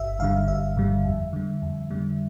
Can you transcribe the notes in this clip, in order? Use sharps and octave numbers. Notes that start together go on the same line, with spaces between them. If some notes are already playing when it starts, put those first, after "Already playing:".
Already playing: G1 E5
G2 D3 G3 F5
G1 E5
G2 D3 G3
F2
D3 G3
F2
D3 G3